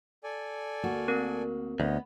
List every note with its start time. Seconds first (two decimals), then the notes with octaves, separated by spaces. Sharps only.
0.23 A4 D5 G#5
0.83 D2 A#3 F#4
1.08 C4 A#4
1.80 D2 B3 C#5 D#5